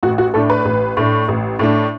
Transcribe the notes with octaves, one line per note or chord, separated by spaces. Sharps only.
A1 F#4
F#4
A2 A3 D4 A4
B4
A1
A2 A3 D4
A1
A2 A3 D4